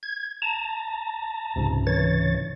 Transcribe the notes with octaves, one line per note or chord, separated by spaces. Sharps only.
G#6
A5 A#5
C#2 G#2 C3
E3 C#5 A6